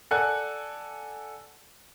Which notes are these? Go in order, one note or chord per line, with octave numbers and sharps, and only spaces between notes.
A4 D5 F#5 G#5 F#6